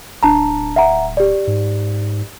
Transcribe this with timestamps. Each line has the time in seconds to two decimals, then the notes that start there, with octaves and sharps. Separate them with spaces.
0.23 D1 D4 A5 A#5
0.76 E5 F#5 A#5
1.17 G4 D5
1.47 G#2